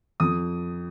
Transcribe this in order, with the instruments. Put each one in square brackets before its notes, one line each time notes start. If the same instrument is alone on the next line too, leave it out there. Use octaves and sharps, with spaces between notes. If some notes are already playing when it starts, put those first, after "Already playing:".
[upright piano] F2 D#6